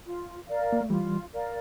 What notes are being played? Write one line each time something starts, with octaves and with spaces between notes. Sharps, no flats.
F4
A#4 D5 F5
A#3
A3
E3 G3 F4
A#4 D5 F5